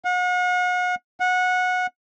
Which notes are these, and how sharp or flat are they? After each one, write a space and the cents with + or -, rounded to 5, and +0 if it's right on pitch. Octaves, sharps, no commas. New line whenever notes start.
F#5 -40
F#5 -20